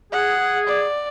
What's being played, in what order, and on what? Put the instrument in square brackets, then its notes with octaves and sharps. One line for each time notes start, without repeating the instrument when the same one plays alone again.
[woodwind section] G#4 [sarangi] F#5
[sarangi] D5